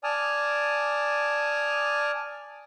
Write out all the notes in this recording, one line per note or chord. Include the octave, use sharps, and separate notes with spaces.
D5 G#5 A5 D#6 F6